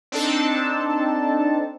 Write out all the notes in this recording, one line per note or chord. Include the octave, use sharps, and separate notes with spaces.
C4 D4 D#4 A4 A5